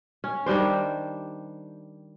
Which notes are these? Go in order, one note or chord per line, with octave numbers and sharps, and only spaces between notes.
C#4
D#3 G3 D4 C5